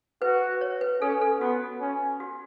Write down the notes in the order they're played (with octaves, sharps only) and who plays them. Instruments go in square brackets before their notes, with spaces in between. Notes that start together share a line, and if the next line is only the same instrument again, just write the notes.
[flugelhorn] F#4 [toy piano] B4
[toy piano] C#5
B4
[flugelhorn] C#4 [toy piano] A4
[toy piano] A4
[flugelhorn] B3 [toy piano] F#4
[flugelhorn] C#4
[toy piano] F#4